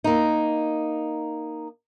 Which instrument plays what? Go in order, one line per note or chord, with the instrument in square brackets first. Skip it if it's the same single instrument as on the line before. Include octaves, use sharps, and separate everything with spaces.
[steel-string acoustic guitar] A#3 D#4